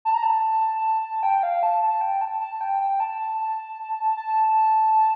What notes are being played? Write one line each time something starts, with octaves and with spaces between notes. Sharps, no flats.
A5
A#5
A5
G5
F5
A5
A5
G5
A5
A5
G5
G5
A5
A5